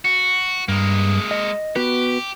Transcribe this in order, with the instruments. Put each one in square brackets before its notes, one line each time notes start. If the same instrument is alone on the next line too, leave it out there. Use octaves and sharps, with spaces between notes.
[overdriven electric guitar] F#4
[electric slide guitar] G2 [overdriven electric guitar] G#3 A#3
[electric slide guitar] D#5
[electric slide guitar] B3 F#4 B4 [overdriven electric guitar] G4